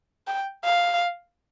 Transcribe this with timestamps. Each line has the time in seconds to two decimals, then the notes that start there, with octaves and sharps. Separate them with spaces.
0.27 G5
0.64 F5